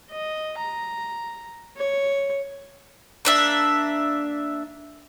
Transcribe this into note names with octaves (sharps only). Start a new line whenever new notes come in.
D#5
A#5
C#5
A#3 D4 E5